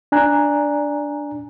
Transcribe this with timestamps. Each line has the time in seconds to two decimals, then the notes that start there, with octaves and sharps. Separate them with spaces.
0.12 D4 D5 G#5 A#5 F#6